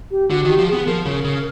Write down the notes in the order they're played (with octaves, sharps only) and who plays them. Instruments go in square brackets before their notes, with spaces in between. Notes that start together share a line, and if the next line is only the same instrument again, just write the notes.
[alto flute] G4
[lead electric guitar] D3 [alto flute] F#4
[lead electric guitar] D#3 [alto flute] G4
[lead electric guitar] F3
[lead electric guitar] B3 [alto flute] G#4
[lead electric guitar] F3 [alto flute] A#4
[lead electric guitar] C#3
C#3